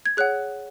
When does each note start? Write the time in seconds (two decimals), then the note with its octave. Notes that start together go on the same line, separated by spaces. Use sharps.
0.05 G#6
0.17 G#4 C#5 F#5 F#6